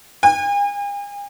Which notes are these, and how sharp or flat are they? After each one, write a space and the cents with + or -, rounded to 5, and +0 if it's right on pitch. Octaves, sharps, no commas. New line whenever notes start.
G#5 -45